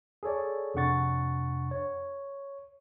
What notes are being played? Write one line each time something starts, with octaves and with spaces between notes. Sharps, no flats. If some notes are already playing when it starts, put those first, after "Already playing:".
G#4 A4 C#5 D5
F2 C3 D4 F#5 C#6 A6
C#5